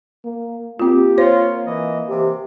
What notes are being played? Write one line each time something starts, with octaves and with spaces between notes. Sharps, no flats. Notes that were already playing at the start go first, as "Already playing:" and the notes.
A#3
A#3 C4 F4 G4
F4 C5 C#5
E3 D#5
C3 E3 G4